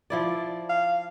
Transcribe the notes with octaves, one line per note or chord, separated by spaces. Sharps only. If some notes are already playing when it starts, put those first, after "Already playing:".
F3 E4 D5
F5